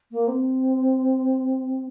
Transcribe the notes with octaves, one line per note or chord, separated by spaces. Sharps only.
A#3
C4